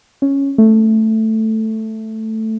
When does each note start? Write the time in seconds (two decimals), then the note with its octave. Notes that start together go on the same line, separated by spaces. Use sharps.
0.22 C#4
0.58 A3